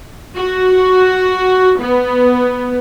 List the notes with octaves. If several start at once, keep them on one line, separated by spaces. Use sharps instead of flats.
F#4
B3